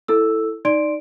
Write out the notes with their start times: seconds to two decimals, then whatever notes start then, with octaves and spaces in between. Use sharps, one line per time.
0.08 E4 A4 E6
0.65 D#4 D5 C6 D7